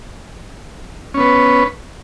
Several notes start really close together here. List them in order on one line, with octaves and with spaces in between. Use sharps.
C#4 B3 B4